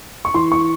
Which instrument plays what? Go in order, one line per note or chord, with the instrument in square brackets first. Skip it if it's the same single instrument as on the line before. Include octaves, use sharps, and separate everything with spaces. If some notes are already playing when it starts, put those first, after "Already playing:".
[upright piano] C#6
E3 C6
C#6